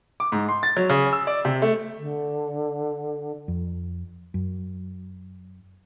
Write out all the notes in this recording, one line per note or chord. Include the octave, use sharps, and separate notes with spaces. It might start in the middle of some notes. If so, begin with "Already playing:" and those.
D6
G#2
C6
A6
F#3
C#3
E6
D5
C3
A3
D3
F2
F#2